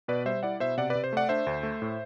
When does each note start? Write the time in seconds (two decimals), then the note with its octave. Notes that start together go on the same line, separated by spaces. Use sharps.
0.08 B2 B4 D5
0.25 G3 C5 E5
0.43 E4 D5 F#5
0.60 B2 C5 E5
0.77 C3 D5 F#5
0.90 B4 D5
0.95 C3
1.04 C5
1.13 A3 D5 F#5
1.29 D4 C5 E5
1.47 D2
1.63 A3
1.82 A2